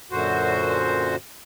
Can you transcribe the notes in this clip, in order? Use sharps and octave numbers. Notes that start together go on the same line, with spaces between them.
F#2 A#2 D3 F#4 C5